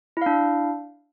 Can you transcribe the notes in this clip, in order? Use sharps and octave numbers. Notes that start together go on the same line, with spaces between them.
D4 E4 F5